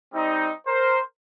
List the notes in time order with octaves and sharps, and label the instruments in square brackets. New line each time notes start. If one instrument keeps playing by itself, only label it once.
[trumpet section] G3 C4 D#4
A#4 C5